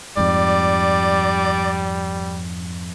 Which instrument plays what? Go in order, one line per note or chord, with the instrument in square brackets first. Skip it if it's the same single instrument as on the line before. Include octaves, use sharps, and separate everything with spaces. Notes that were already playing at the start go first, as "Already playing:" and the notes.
[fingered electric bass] F2 G#2 [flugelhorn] G3 [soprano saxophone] D5